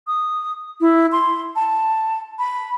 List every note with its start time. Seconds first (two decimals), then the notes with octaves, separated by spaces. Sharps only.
0.07 D#6
0.81 E4
1.12 C6
1.56 A5
2.39 B5